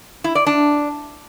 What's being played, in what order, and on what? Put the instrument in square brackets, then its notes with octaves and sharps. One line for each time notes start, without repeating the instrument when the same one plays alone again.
[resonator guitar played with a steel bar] E4
D5
D4